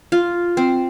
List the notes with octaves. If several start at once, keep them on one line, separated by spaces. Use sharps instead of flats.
F4
C4